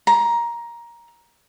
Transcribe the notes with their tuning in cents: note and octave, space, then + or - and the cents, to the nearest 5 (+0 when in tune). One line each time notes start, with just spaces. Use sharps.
A#5 +15